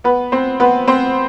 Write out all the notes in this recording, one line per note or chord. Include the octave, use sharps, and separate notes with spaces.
B3 B4
C4 C5
B3 B4
C4 C5